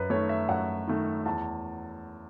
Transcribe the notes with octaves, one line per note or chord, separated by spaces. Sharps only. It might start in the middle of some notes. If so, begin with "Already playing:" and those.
Already playing: F#2 B4
D#3 A3 C#5
E5
F#2 F#5
D#3 A3
E2 A5